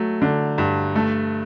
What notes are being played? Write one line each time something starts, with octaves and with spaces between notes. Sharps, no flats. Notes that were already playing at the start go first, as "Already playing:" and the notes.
Already playing: F#3 A3
D3
G2
A3